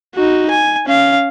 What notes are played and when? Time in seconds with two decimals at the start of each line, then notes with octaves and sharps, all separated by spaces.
0.15 D#4 F#4
0.50 G#5
0.87 C#4 F5